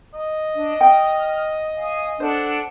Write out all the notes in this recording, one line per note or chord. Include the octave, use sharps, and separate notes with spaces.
D#5
D4
G5 D#6 F6
F5 G#5 D#6
D4 A4 C5 F#5